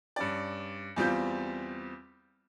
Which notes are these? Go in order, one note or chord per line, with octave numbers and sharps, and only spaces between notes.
G2 C#4 D5
E2 G3 C4 F4 G6